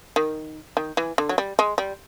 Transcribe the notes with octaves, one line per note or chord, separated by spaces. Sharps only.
D#3
D#3
E3
D3
F#3
G3
G#3
G3